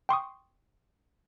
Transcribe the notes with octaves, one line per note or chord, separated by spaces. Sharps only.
G5 C6 C#6 D#6